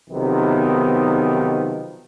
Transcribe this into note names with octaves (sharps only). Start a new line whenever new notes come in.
B1 C3 D#3 F3 B3